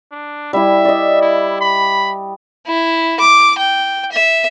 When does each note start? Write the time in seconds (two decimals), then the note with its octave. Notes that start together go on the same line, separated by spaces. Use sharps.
0.11 D4
0.53 G3 E4 E5
0.85 D5 D#5
1.21 E4
1.60 B5
2.67 E4
3.20 D6
3.58 G5
4.12 E5